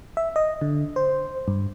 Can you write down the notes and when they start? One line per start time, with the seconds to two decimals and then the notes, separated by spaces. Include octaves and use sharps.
0.17 E5
0.36 D#5
0.61 D3
0.96 C5
1.48 G2